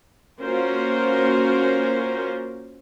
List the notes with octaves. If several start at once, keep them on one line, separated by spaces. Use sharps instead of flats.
A#3 C#4 F4 F#4 A#4 C5